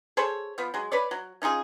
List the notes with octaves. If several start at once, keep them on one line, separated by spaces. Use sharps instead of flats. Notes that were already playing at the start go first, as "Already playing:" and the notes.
G#4 A4 C5 C#5
F3 B3
F#3 G#3
B4 C#5 D5
F#3
C#4 D#4 F4 G#4